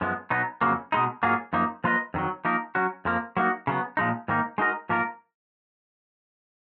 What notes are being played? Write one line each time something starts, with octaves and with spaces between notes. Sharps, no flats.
F#2 F3 G#3 B3
B2 F#3 B3 D#4
F2 C#3 F#3 A#3
B2 G#3 D#4
G#2 F#3 A#3 F4 G#4
F#2 F3 A#3 D#4
F3 A#3 F4 B4 D#5
F2 D#3 F#3
F3 A#3 D#4 A#4
F#3 C#4 F#4
F2 F3 A#3
F#3 A#3 D#4 F#4
C#3 F#3 B3
A#2 F3 G#3 D#4
G#2 D#3 A#3 D#4
G#3 D#4 F#4 A#4 D#5
G#2 F3 A#3 F4 A#4